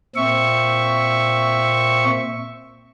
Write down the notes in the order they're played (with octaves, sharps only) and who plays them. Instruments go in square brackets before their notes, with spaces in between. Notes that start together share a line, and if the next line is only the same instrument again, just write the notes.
[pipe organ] A#2 C4 E5 C#6